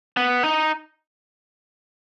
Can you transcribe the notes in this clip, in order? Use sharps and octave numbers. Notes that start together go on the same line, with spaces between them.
B3
D#4